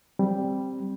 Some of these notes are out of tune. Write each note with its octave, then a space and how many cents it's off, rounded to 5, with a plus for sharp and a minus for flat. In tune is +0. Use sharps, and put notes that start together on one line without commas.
G3 +0 C4 +0